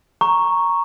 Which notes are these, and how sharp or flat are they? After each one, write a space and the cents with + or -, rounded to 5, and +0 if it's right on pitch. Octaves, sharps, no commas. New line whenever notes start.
A#5 +0 C#6 +0